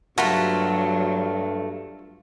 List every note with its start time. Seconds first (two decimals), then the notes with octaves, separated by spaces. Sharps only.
0.18 G2 F#3 A3 A#3 F4 F#4 B5